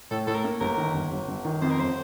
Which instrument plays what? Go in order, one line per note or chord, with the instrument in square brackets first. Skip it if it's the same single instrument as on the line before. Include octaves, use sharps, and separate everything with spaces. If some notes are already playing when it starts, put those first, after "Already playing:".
[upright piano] A2 [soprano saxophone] A4
[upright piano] A2 [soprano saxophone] A4
[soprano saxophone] A#4
[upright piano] A#3
[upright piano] G1 [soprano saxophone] A#4
[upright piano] D#3
G1
G1
G1
D#3
[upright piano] F2 [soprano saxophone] C5
[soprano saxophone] A#4
[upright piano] G1 [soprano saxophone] C5